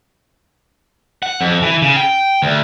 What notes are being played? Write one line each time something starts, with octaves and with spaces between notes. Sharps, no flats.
F#5
F2
E3
C#3
G5
D2